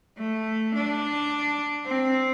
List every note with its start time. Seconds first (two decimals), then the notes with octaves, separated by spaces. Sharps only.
0.18 A3
0.75 D4
1.86 C4